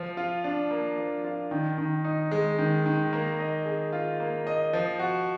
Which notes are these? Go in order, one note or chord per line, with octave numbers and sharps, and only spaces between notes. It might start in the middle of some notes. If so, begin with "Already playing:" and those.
Already playing: F3
F4
D4
A#3
F3
F4
D#3
D#3
D#4
G#3
D#3
D#3
A#3
D#5
G#4
F4
A#3
D#5
F3
F#4